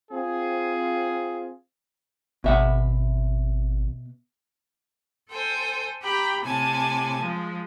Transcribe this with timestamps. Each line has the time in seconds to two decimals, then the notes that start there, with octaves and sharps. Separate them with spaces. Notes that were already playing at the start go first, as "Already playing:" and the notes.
0.12 C4 F4 G#4
2.44 G#1 B2 E5 F#5
5.30 A4 C5 G5 G#5
6.03 G4 G5 A#5 B5
6.42 A2 C3 G#5 A5
7.21 F3 G#3